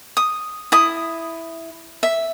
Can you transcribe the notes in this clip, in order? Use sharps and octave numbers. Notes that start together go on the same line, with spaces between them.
D#6
E4 D#6
E5